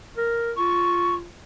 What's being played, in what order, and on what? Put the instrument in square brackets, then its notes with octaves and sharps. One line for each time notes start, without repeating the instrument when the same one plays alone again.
[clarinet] A#4
[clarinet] F4 [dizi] C#6